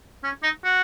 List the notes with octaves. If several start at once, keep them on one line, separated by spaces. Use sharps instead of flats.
C#4
D#4
F#4